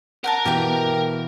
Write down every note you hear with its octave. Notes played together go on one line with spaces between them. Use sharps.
A#4 F#5 G5 A5 A#5
B2 E3 G4 F5 G5